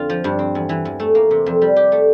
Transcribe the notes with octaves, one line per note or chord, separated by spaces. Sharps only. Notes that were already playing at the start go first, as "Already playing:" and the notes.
Already playing: F2 D3 F4
F3
G2
C4
E2
E3
E2
A3
A#3
C3
F2
G3
G4
A3